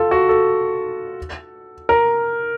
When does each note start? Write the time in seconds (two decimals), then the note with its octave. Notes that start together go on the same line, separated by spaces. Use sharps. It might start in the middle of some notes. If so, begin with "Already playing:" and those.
Already playing: F4 A4
0.11 F#4
0.29 A4
1.89 A#4